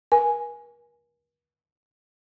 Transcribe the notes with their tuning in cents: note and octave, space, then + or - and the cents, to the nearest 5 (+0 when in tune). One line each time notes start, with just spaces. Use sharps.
A#4 +45 G#5 +0